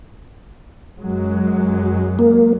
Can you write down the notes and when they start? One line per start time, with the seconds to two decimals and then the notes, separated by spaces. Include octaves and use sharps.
0.99 F#2 F#3 G#3
2.19 A#3